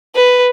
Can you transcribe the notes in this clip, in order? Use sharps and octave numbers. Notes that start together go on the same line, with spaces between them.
B4